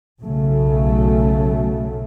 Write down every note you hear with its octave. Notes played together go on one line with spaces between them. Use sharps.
B1 C#3 F#3 A3